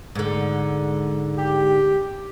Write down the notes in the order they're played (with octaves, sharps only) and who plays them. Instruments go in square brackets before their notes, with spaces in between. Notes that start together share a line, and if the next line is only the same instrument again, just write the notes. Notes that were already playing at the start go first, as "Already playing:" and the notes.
[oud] G#2 D3
[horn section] G4